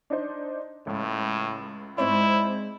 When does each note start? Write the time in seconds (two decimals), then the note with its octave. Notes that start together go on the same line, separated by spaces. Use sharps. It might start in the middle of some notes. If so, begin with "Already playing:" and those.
0.10 D4 D#4 C5
0.87 C#2 A2
1.98 G#2 G#3 C4 E4 C#5 D5